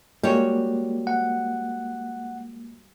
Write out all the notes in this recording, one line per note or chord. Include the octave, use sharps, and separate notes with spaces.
G3 G#3 A#3 F#4 C#5
F#5